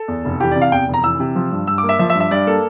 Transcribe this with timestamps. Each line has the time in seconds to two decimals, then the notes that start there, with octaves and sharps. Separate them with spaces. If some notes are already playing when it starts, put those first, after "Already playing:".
Already playing: A4
0.08 E2
0.25 F1
0.40 E3 G4
0.51 C3 D5
0.62 F5
0.72 E2 G5
0.88 F1
0.94 A#5
1.04 E3 E6
1.20 C3
1.36 F3
1.52 G2
1.67 G2 E6
1.78 D6
1.83 A#3
1.89 E5
1.99 F3 E5
2.10 E5
2.15 G2
2.20 E5
2.31 G2 D5
2.47 A#3 A4